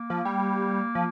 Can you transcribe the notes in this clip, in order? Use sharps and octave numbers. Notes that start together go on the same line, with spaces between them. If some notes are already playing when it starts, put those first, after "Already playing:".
Already playing: A#3
F3
G3
F3